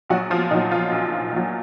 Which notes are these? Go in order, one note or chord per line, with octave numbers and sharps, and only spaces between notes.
A#1 F#3 F#4
F3 F4
A#2 F#3 D#4
F3 F4
A#1
A#2 F#3